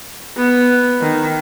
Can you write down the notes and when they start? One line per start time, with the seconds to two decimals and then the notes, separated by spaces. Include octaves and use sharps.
0.37 B3
1.01 D#3